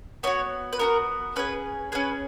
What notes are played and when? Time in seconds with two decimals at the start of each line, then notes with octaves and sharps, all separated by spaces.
0.23 B3 D#4 C#5
0.27 F#4
0.73 B4
0.79 B3 D#4 F#4 A#4
1.36 C#4 G#4 B4
1.92 C#4 G#4 B4